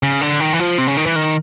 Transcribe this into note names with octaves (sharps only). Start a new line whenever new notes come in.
C#3
D3
D#3
E3
F3
C3
C#3
D#3
E3
D#3